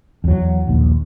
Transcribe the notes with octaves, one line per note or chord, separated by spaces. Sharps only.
E2 F#3
A#1 D#2